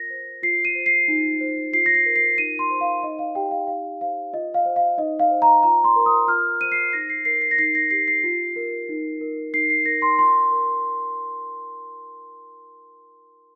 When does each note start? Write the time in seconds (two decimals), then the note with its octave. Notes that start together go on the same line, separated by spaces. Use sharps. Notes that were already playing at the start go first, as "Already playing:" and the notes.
Already playing: F4 A#4 A#6
0.10 C5
0.42 F4 C7
0.65 D#7
0.75 C5
0.86 C7
1.08 D#4
1.41 C5
1.73 F4 C7
1.86 A#6
1.95 C7
2.05 A#4
2.16 C7
2.38 D#4 D#7
2.59 C6
2.70 C5
2.81 F5
3.03 D#4 D#5
3.19 F5
3.35 G4 G5
3.51 F5
3.67 D#4 F5
4.01 C5 F5
4.33 F4 D#5
4.54 F5
4.65 C5
4.76 F5
4.98 D#4 D#5
5.20 F5
5.31 C5
5.42 A#5
5.63 F4 A#5
5.84 C6
5.96 A#4
6.06 D#6
6.28 F4 F6
6.61 C5 D#7
6.72 C7
6.93 D#4 A#6
7.09 C7
7.25 A#4 C7
7.42 C7
7.51 A#6
7.58 D#4 C7
7.75 A#6
7.91 G4 C7
8.08 C7
8.24 F4
8.56 A#4
8.89 D#4
9.21 A#4
9.54 D#4 C7
9.70 C7
9.86 A#4 A#6
10.02 C6
10.19 F4 C6
10.52 A#4